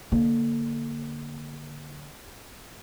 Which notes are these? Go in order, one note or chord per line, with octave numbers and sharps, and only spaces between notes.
D3 A#3